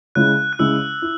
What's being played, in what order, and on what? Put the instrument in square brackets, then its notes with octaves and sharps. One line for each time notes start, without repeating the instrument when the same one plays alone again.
[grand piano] C#3 G#3 C#4 E4 [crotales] F#6
[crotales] F#6
[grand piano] C#3 G#3 C#4 E4 [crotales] E6
[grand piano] E4